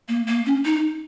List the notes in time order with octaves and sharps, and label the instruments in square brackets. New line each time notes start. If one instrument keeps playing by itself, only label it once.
[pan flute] A#3
A#3
C#4
D#4